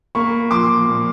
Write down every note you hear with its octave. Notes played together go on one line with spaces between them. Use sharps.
A#3 B5 C#6
F3 C6 D6
A#2